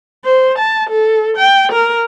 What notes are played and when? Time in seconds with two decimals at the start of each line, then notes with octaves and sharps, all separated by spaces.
0.25 C5
0.58 A5
0.89 A4
1.37 G5
1.72 A#4